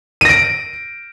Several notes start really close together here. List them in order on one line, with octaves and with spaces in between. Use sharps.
D#7 A#6 D7